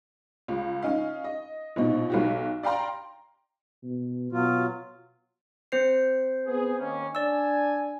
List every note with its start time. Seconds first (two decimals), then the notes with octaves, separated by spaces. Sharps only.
0.48 C#2
0.82 C#4 D#4 F5
1.24 D#5
1.76 A#1 B2 D#4
2.10 B1 F#4 G4
2.63 D5 F5 G5 A#5 C6
3.83 B2
4.32 B2 F#3 F4
5.72 C4 C5 C7
6.46 B3 G#4
6.79 D#2 A#3 C#4
7.15 D4 D5 G#5 E6